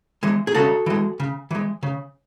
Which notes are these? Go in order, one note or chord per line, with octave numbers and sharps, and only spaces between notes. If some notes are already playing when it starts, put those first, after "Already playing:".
E3 G#3
G#4
C#3 F#4 A4
E3 G#3
C#3
E3 G#3
C#3